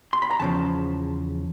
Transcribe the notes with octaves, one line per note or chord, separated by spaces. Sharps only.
C6
B5
A#5
E2 C#3 F3 A5